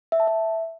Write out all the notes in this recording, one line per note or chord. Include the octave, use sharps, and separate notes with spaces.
E5
A5
E5